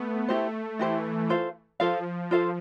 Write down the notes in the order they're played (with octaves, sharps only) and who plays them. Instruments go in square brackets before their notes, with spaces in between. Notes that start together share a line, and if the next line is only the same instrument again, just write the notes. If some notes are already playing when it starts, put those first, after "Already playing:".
Already playing: [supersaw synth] A3 B3
[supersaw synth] A3 [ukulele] E4 G4 C5
[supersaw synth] E3 [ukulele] E4 G4 C5
[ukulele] F4 A4 C5 F5
[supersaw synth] F3 [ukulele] F4 A4 C5 F5
[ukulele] F4 A4 C5 F5